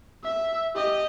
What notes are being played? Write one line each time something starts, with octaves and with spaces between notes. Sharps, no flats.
E5
G4 D#5